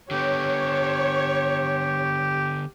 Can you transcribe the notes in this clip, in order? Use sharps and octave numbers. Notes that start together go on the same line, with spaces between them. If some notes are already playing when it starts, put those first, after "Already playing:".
D3 B3 G4 C#5